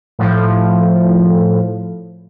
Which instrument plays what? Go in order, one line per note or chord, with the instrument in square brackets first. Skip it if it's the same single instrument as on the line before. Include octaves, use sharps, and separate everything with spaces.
[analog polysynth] A2 F3